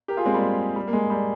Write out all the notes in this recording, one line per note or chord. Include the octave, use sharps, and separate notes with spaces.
G4 A#4
F4 G#4
G#3 C4
G3 A#3
G3
A#3
G#3
G3 A#3